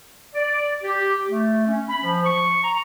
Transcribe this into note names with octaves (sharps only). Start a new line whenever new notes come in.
D5
G4
A3
C#4
B5
F3
C#6
A#5